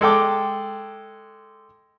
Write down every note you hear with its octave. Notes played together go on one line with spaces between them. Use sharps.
G#3 A4 G5 D6